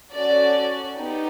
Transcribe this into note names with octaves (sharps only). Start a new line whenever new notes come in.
C#4 F#4 A4 D5
B3 D#4 G4